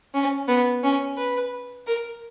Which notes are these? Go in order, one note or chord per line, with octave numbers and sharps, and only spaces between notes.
C#4
B3
C#4
B4
A#4